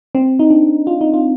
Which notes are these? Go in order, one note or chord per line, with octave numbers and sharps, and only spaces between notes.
C4
D#4
D4
F4
D#4
F4